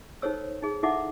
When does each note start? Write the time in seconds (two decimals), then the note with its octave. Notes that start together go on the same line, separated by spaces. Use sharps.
0.22 D#4 A4 C5 C#5 E6
0.62 D#4 G#4
0.83 D#4 E4 A4 E5 F#5 D6